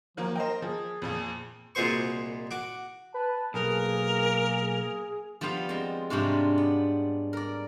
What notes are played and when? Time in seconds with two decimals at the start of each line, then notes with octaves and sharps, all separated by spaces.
0.17 D#3 F3 F#3 A#3
0.36 A#4 C5 D#5 G5
0.62 F3 G#4
1.02 F2 A#2 F3
1.75 C2 A#2 G#3 F#4 C5 C#6
2.51 F#4 D6
3.14 B4 A5
3.54 B1 A#3 G#4 A#4
5.41 F3 G3 B3 F4 F5
5.69 G#3 C4
6.10 G#2 C3 G3 C#4 D4 F4
6.58 B3
7.33 A#4 D5